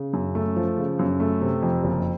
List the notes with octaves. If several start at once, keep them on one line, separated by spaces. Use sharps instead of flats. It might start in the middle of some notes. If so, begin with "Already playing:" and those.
Already playing: C#3
F#2
A3
F3
C#3
F#2
A3
C3
F2
F#1